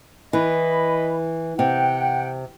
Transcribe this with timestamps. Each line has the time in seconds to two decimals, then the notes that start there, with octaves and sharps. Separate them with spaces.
0.33 E3 D#5 B5
1.59 C3 F#5 G5